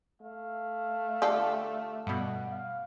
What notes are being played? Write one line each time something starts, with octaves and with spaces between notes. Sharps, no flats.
A3 F5
D3 F4 G4 A4
G2 B2 F#5
F5